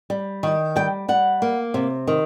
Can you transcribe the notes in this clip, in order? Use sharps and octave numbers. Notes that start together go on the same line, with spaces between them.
G3
D#3
G3 G5
G3 F#5
A#3
C3
D#3